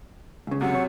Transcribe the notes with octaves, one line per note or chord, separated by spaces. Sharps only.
C#2 C#3
F#2 C3 F#5
C#5